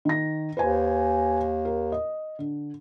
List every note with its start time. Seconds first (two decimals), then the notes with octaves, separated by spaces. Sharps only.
0.05 D#3 A#6
0.57 D#2 B4 C5 G#5
1.65 A#4
1.92 D#5
2.39 D3